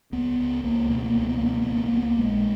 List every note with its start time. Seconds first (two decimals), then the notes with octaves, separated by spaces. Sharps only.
0.12 C#2 B3
0.39 C#2
0.64 C#2 A#3
0.89 B2 A#3
0.98 B3
1.05 A#3
1.14 C#2 B3
1.22 A#3
1.29 B3
1.37 A#3
1.41 B2
1.46 B3
1.53 A#3
1.62 B3
1.67 C#2 A#3
1.77 B3
1.86 A#3
1.92 C#2 B3
2.02 A#3
2.18 A#1 G#3